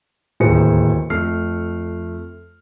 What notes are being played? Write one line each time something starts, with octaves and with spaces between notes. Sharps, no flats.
D1 D#2 G#4 B4 C5 C#7
F2 A3 F6 C7